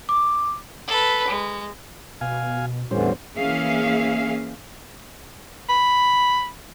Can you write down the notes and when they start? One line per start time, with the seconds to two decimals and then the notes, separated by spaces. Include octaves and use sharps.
0.09 D6
0.88 A4 B4
1.28 G#3
2.21 B2 F5 G#5
2.91 E2 A2 D3 E3 G3 C#4 C5
3.38 E3 A#3 C#4 G#4 E5 F5
5.69 B5